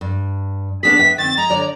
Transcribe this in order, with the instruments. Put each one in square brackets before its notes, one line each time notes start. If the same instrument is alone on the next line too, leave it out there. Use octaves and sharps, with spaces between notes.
[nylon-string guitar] G2
[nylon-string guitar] B3 D4 G#4 [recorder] B6
[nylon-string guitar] B4 E5 G5
[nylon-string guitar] D#3 C4 [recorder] A6
[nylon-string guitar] G#3 [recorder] A#5
[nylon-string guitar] D3 C#5 D5